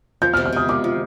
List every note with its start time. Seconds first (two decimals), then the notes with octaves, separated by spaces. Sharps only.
0.22 F3 G6
0.34 F6
0.37 C3
0.46 F6
0.53 C3 D#6
0.69 F3 D6
0.84 F3